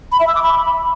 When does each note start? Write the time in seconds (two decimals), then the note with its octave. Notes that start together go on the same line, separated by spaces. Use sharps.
0.12 B5
0.20 E5
0.27 E6
0.35 D6
0.43 B5